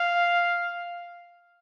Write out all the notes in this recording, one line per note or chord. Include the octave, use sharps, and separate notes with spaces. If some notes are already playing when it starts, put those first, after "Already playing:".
Already playing: F5